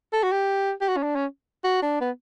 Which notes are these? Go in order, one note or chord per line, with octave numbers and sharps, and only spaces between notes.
A4
F#4
G4
G4
F#4
C#4
D4
C#4
F#4
D4
B3